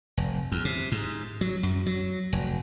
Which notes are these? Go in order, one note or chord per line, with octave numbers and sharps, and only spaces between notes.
F1
E2
C3
G#2
F#3
F#2
F#3
F1